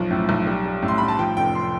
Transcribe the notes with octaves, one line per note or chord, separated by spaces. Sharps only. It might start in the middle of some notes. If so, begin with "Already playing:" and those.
Already playing: B1 F3
A2
B1
G3
G3
A2
C6
A2 B5
A5
F3 G5
F1 G5
C6